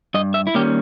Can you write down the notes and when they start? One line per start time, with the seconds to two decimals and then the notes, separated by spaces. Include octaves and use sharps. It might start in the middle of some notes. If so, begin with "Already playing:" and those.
0.14 G2 D#5
0.34 E5
0.47 E4
0.55 D#3 G3 A#3 C#4 G4